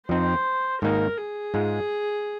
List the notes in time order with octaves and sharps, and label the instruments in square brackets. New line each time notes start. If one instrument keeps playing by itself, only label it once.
[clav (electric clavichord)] F2 F3 C4 D#4 [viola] C5
[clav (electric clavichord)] G#2 D#3 A#3 D#4 [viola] A#4
[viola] G#4
[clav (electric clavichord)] G#2 G#3 F4